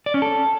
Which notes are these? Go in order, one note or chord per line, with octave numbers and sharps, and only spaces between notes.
D5
C#4
A4